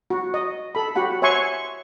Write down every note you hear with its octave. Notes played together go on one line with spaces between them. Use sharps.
F#4
D#5
A4 B5
F#4 G4 F#5 B5
C#5 E5 F#5 G#5 C6 C#6